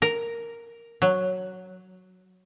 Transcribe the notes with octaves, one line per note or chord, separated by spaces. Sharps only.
A#4
F#3